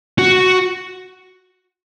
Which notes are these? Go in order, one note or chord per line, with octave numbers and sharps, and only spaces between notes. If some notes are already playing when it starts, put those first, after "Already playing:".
F#4